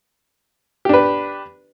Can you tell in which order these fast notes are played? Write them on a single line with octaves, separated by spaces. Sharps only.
G4 D4 B4